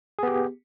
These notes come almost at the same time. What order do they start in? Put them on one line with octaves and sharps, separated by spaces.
G#4 B3 G4